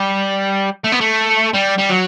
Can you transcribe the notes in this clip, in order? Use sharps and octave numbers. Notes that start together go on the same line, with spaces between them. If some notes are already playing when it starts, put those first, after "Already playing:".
Already playing: G3
A3
B3
A3
G3
G3
F#3